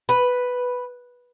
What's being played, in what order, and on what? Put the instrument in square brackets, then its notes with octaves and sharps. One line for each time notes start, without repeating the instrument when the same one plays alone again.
[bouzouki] B4